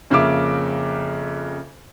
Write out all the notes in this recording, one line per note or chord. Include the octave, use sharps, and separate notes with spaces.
F2 C#3 A#3 E5 D6